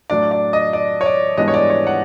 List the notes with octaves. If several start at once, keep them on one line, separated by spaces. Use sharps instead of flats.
A2 F#3 A3 D4 D5
D5
D#5
D5
C#5
D5
G#2 E3 G3 B3 D4 D#5
C#5
D5
C#5
F#5